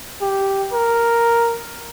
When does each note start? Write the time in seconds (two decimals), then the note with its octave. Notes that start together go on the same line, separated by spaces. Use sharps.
0.21 G4
0.73 A#4